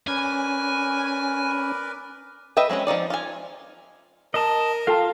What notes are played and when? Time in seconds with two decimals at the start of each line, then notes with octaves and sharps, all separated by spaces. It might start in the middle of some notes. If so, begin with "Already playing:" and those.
0.07 C#4 A#4 B4 D5 G#5
2.57 B4 D#5 E5 G5
2.70 G#3 C4 C#4 F#4
2.87 F3 F#3 D#4 D5
3.10 F4 G#5
4.34 A#4 D#5 A5
4.87 F4 A4 F5 G5 A5